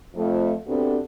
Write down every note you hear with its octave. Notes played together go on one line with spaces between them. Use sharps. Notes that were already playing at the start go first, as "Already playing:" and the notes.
F2 F3 A3
C3 B3 C4 D4 F#4 A4